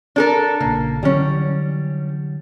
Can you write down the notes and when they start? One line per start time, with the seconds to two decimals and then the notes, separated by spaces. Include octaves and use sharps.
0.16 D4 A4 A#4
0.60 A#1 C#3 A#3
1.03 D3 E3 F#3 G3 C#4